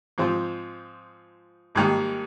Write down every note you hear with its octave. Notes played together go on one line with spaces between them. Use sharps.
G#2 F3 C4 F4
G#1 G#2 D#3 G3 A#3